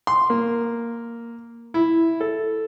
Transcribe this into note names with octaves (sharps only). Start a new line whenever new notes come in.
C6
A#3
E4
A4